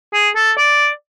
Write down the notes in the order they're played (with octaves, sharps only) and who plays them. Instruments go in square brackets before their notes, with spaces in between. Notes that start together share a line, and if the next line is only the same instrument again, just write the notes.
[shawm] G#4
A4
D5